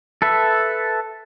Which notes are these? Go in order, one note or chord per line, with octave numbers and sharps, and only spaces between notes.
A4 B4 E5